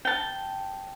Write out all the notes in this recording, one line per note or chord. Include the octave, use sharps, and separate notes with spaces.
G5 A5